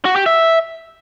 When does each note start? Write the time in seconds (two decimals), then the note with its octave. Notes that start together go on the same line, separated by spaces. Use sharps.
0.05 F#4
0.16 G4
0.26 E5